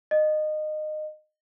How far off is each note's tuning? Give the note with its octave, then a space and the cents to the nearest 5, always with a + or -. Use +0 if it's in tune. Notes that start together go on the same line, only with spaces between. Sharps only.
D#5 -20